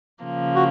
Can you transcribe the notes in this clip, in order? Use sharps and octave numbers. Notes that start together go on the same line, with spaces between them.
C#3 F3 A#3
F#4